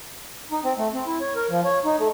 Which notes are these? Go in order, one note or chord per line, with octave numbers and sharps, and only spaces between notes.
D#4
C4
A3
C4
E4
C#5
A#4
F3
C#5
D#4
A3